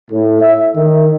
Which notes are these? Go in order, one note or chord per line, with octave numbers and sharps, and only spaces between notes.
A2
E5
D#3